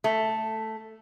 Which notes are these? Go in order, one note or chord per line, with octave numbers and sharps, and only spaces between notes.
A3